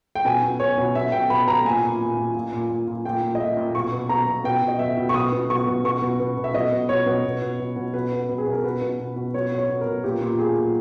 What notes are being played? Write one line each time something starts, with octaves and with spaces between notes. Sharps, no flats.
G5
B2 G#5
B2
B2 C#5
B2
B2 E5
B2 G5
B2 B5
B2 A#5
A#2 G#5
A#2
A#2
A#2
A#2
A#2
A#2
A#2
A#2 G5
A#2
D#5
A#2 E5
A#2
B2 C#6
B2
B2 A#5
B2
B2 G5
B2
D#5
B2 E5
B2
C#6
B2 D#6
B2
B2 C#6
B2
B2 C#6
B2
B2
B2
E5
B2 D#5
B2
B2 C#5
B2
B2
B2
B2
B2
B2 B4
B2
B2
G#4
B2
A#4
B2 B4
B2
B2
B2
B2 C#5
B2
C#5
B2
B2 A#4
A#2 G4
A#2
A#2 G#4
A#2